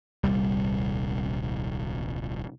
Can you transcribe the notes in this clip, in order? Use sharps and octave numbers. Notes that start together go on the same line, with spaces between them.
D#1 C2 G3